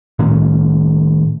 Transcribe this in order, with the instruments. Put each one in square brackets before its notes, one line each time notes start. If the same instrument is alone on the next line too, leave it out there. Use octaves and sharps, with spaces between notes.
[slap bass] A2 D#3 C#4